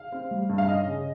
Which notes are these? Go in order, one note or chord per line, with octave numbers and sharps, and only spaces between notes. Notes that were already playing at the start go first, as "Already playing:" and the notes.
Already playing: F5
C4
G3
G2
F5
C#4 D#5
C#3